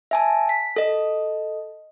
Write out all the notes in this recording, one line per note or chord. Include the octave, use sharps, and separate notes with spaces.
E5 G#5 A5
B6
A4 D#5